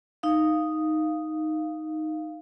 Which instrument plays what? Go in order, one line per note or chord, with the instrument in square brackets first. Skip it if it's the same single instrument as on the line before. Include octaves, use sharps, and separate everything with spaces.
[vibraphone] D#4 F5